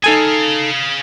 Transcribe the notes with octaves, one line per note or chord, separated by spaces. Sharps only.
D#4 G#4 A4 F5 G#5